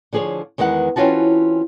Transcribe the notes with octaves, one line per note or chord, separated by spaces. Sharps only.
D3 F3 G#4 C5 C#5
E2 D#3 G#3 B4 F#5
E3 C4 C#4 F4 F#4 A5